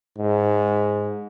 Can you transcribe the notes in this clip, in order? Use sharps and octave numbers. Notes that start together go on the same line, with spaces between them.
G#2